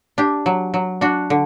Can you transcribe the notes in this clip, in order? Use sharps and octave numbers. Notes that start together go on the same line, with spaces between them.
D4 G4
F#3
F#3
D4 F#4
D3